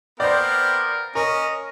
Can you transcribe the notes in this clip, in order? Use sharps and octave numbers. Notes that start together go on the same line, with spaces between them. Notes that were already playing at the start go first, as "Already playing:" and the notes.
B3 A#4 C5 D5 F5 G5
C#4 A#4 D#5